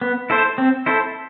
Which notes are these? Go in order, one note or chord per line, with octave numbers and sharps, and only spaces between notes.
B3
E4 A4 C5
C4
E4 A4 C5